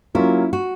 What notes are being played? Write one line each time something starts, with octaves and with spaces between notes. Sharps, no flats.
F#3 A#3 C#4 E4 F4
F#4